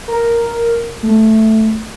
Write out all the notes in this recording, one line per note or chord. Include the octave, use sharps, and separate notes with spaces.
A#4
A3